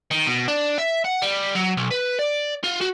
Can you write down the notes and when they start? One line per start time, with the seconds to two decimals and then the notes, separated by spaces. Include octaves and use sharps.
0.11 D#3
0.27 B2
0.48 D4
0.78 E5
1.05 F#5
1.23 G3
1.56 F#3
1.77 B1
1.91 B4
2.19 D5
2.64 F4
2.81 F#4